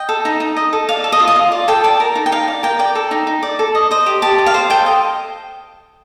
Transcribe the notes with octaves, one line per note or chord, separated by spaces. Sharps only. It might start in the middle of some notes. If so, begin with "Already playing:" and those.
Already playing: D#5 G5
A4
D#4
D#4
D#5
A4
D5 F5
A4
D#5
F4
D#5
F4
D5
A4 G5
D5 A5
A#4
D#4
G5
D#4 F5
D5
A#4 G5
D5 G5
A4
D#4
D#4
D5
A4
D#5
C5 D#5
G4
G4 A5
D#5
F5
C5
A4 G5
D#5